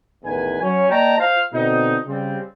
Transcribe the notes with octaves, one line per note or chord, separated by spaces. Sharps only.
A1 E2 D#3 B4 G#5
F#3 C#4
A#3 D5 D#5 G5 A5 A#5
F4 C5 F5
B2 D3 C4 D#4
C#3 G3 C4